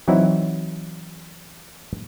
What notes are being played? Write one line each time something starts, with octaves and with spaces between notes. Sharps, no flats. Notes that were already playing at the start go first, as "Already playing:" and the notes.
E3 F#3 C4 D#4 E4 F#5